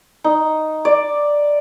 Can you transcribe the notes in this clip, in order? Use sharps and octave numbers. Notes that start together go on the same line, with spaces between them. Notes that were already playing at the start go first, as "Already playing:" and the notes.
D#4
D5